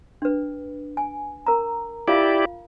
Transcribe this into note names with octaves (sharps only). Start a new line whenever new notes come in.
D4 B4
G#5
A#4 A#5
E4 F4 G4 D5 F5